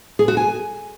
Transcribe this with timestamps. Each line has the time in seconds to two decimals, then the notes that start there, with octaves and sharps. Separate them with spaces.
0.19 G#4
0.28 F#4
0.37 G#5